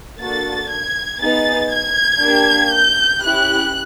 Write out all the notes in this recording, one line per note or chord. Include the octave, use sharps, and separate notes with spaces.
A#3 D4 F#4 A4 A6
G#6
B3 D#4 G#4 A6
G#6
A#3 D4 G4
G6
C#4 E4 G4 F#6